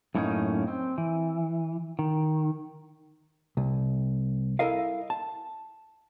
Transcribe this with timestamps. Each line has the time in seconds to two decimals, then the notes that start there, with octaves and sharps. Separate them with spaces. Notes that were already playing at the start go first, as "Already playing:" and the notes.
0.15 F#2 A2 A#3 B3 C#4 D#4
0.68 C4
0.98 E3
1.99 D#3
3.57 C2
4.59 E4 A4 A#4 D#5 F5
5.10 A5